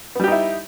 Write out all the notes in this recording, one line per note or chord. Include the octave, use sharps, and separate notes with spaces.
G3 B3 D#4 E4 G4